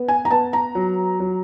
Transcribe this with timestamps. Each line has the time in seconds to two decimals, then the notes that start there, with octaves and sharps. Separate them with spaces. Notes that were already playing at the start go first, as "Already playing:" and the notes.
Already playing: B3
0.08 G#5
0.25 A#5
0.31 B3 A5
0.53 A#5
0.75 F#3
1.20 F#3